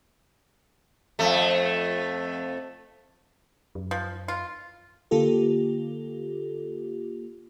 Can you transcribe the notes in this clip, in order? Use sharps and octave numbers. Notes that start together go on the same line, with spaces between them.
F2 A3
F#2
F3
F4
D3 A#3 F4 G4 A4